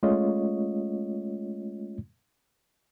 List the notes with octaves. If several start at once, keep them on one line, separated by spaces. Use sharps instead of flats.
G#3 A3 C#4 F4 C#5 D#5